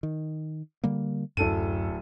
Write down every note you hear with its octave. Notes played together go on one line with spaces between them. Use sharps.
D#3
D3 G3 A#3
D1 F#2 A4 D#7